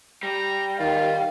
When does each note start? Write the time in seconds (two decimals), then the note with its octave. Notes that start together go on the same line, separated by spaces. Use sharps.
0.23 G3 A#5
0.80 D#3 F4 F5